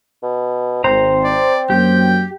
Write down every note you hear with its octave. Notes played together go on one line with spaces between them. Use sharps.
B2
G#1 C4 C5 A#5
D5
F#2 F#3 A#3 G4 G5